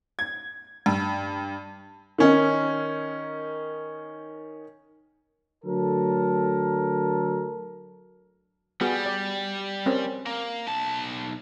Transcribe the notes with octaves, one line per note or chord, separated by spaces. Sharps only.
G#6
G2
D#3 C#4 D#4
D3 F#3 A3 A4 A#4
G3 B3 F#4 G#4
D5
C4 C#4 A#4
A#3
B1 A5